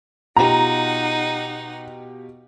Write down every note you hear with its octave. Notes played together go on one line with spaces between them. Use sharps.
B2 D#4 F4 G4 F#5 A#5